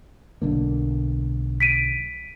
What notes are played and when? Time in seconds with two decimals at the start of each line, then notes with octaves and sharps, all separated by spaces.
0.42 B1 D3 A#3
1.60 B6 D7 D#7